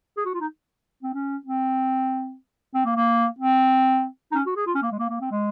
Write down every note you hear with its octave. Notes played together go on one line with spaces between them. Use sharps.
G#4
F#4
F4
D#4
C4
C#4
C4
C4
A#3
A#3
C4
D#4
C#4
F#4
G#4
F4
C#4
A#3
G#3
A#3
A#3
C4
G#3